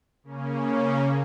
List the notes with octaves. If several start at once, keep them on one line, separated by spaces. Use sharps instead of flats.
C#3 A#3 C#4